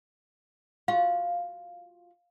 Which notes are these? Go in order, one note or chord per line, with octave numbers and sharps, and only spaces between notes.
F4 F#4 F5